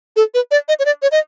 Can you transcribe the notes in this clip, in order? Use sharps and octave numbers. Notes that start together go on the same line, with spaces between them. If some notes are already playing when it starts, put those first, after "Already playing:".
A4
B4
D5
D#5
C#5
D5
C#5
D#5